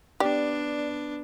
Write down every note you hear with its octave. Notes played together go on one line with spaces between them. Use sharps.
B3 D4 G4 D5